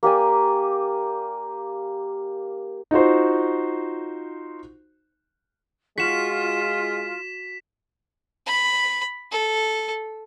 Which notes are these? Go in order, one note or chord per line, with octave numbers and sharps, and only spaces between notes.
A#3 G4 D5 G#5
D#4 F4 F#4 C5
G#3 F4 F#4 B6 E7
B5
A4